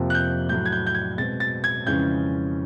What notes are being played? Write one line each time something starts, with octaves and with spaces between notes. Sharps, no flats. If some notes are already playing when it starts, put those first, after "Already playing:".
Already playing: F2 C3 F3 A#3
F#6
G6
A2 F#3 A3 G6
G#6
G6
G6
G#6
B2 G#3 C4 A6
A6
G#6
F2 C#3 E3 G#3 C#4 G6